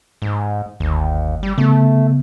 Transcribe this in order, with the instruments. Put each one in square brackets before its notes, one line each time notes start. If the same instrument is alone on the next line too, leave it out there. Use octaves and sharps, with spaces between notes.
[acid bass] G#2
[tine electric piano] G1 [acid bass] D#2
[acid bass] G3
[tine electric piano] C#3 B3 [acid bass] A3